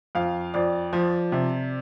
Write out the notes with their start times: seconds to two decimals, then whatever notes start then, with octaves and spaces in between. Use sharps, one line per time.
0.15 F2 F5
0.54 F2 D5
0.93 F3
1.32 C3